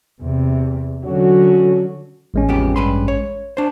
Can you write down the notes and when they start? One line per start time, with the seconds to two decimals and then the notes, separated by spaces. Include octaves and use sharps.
0.21 E2 C3
1.05 D3 F#3 C#4 F#4
2.34 A1 G#3 C#4
2.49 F2 B3 G4
2.76 G2 B4 C6
3.08 C#5
3.57 D4 C5